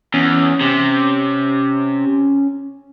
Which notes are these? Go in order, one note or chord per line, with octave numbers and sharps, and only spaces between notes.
E2 C#4
C3